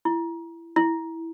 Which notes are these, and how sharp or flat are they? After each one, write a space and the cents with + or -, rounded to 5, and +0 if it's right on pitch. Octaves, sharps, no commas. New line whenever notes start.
E4 +25
E4 -5